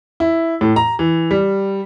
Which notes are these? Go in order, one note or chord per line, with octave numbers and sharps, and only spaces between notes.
E4
A2
A#5
E3
G3